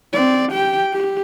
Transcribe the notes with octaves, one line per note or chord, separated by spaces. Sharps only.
C4 D5
G4 G5
G4